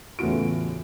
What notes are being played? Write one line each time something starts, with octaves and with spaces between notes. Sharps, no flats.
E2 A2 C#3 F4 F#4 D7